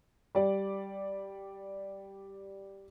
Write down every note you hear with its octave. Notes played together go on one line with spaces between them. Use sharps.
G3 D5